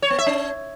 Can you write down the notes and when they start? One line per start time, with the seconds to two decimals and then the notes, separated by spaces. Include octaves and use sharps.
0.02 C#5
0.10 B3
0.18 E5
0.27 C#4